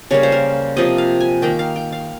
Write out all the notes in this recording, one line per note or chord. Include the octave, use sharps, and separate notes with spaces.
C#3 G3 A#3 C#5
C5
A#4
C3 F3 A#3 D#5
F5
G#5
D#3 A#3 G5
F5
G5
F5